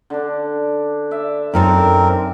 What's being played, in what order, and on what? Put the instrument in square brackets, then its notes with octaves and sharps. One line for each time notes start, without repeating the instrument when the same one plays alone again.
[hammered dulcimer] D3 D4
D5 E5
[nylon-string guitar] F#2 D#4 A4 [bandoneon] C4 A#4